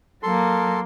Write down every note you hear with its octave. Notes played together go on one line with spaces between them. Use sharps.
F#3 A#3 A4 C6